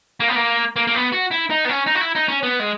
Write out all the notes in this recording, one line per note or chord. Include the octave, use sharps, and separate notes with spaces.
A#3
B3
A#3
A#3
A#3
B3
F#4
E4
D#4
B3
C#4
D#4
F#4
E4
D#4
C#4
B3
G#3